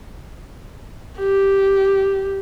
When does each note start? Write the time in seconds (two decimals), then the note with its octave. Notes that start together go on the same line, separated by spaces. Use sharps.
1.19 G4